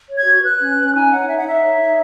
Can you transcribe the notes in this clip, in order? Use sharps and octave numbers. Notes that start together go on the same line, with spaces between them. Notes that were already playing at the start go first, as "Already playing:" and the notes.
C#5
G#6
F#4
B4 F#6
C#4
C#4
D#4 G#5
C#5 F#5
D#4 E5
F#5
D#4 E5
C#5
D#4